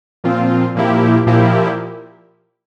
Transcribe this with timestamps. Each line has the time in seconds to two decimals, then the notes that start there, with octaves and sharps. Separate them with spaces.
0.24 A#2 F3 C4 F4
0.75 A#2 F3 A#3 E4 G4
1.26 A#2 F3 A#3 E4 G4